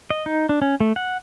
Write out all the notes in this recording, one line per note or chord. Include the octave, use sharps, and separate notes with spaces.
D#5
D#4
D4
C#4
A3
F#5